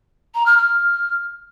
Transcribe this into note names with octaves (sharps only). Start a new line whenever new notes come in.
A#5
F6
F6